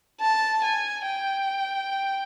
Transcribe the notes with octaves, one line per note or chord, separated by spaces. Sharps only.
A5
G#5
G5